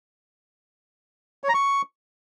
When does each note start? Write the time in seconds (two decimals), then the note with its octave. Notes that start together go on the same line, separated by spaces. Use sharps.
1.44 C#5
1.49 A#5
1.54 C#6